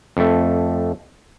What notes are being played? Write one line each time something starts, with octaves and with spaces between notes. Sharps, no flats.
F2 A3